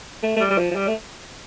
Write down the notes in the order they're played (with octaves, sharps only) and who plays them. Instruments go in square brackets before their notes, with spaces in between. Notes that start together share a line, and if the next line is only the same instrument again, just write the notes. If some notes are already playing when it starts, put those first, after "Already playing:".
[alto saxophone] A3
A3
G3
G3
F3
F3
G3
A3